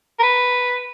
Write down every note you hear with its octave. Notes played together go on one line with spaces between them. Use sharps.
A#4
B4